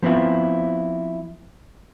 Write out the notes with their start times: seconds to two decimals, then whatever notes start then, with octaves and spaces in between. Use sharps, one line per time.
0.02 F3 B3 C4 E4 F4